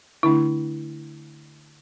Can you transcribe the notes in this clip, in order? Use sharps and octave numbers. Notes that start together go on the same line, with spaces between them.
D3 A3 D4 E4